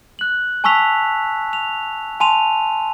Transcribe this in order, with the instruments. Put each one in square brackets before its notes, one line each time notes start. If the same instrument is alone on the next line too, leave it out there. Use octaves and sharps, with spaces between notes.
[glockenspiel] F#6 F#7
G#5 A5 C#6 E6 B6 F7
F7
G#5 A5 C6 D#7 F7